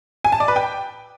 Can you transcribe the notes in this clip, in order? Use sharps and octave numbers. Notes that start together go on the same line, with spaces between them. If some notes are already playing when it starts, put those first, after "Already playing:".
G#5
A5
D5
B4
G5